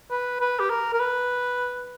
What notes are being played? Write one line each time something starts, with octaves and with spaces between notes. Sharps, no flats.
B4
B4
G4
A#4
A#4
B4